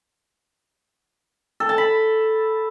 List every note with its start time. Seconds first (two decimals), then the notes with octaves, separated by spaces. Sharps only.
1.60 A4
1.69 A5
1.78 B5